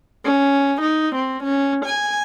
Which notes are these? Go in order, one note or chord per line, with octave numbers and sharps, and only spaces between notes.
C#4
D#4
C4
C#4
G#5